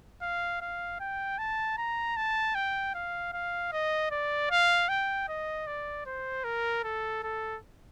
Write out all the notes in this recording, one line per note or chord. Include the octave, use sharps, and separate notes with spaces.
F5
F5
G5
A5
A#5
A5
G5
F5
F5
D#5
D5
F5
G5
D#5
D5
C5
A#4
A4
A4